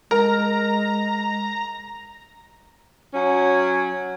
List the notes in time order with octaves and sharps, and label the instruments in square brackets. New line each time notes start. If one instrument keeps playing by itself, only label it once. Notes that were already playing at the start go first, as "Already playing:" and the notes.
[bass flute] G#3 [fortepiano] A#4 [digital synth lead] A#5
[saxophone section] F#3 C#4